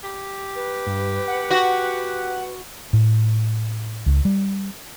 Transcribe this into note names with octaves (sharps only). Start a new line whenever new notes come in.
G4
B4
G2
F#5
F#4
A2
C#2
G3